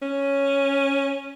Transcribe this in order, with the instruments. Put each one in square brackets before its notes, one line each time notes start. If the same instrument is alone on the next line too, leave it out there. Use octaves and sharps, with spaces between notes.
[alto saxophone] C#4